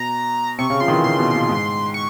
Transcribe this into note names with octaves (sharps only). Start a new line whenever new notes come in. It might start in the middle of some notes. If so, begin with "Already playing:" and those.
Already playing: B2 A#5
C3 C#6
C#3
F3 C6
D#3
E3
C#3 C6
B2
A#2
G#2
C#6